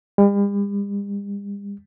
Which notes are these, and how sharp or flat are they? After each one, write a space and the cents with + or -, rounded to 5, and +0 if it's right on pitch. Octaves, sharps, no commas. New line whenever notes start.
G3 +45